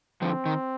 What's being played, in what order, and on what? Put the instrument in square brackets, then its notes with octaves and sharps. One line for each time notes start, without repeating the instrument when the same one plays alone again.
[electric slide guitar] D3 F3 [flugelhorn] C4
[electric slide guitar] D#3